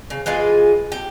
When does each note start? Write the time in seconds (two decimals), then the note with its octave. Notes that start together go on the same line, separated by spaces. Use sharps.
0.10 C#3
0.26 E3 G#3 F4 G#4
0.92 G4